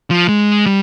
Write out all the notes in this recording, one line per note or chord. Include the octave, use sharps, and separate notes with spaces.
F3
G#3
G3